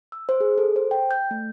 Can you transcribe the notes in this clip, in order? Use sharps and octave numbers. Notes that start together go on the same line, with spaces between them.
E6
C5
G#4
A4
C5
G5
G6
A3